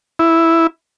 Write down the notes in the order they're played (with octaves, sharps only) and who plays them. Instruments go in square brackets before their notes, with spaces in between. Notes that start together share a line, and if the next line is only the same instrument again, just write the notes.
[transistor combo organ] E4